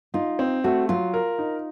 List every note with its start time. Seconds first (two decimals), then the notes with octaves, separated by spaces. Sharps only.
0.14 D#4 F4
0.39 C4
0.64 A3 F#4
0.89 F#3 F4
1.14 A#4
1.39 D#4